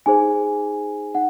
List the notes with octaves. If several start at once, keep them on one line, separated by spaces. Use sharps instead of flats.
D#4 G#4 C5 G#5
D#4 F#5